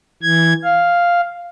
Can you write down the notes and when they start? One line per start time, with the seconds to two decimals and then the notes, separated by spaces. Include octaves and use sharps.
0.22 E3 G#6
0.64 F5